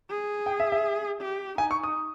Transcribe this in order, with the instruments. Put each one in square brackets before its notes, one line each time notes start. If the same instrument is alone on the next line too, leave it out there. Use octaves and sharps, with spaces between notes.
[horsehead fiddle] G#4
[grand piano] G5
E5
E5
[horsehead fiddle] G4
[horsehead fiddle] D#4 [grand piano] G#5
[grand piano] C#6
D#6